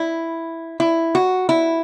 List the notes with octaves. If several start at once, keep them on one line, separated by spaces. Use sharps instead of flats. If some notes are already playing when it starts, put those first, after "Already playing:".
Already playing: E4
E4
F#4
E4